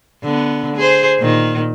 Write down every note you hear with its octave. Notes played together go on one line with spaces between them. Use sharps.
D3 B3
G#4 C5
A#2 D#3